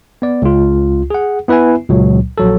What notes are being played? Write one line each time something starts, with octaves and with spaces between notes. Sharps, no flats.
B3 D5
C#2 F4
G#4 F#5
B3 E4 B4 E5 G#5
C#2 A#2 F#3
A#1 F#3 A4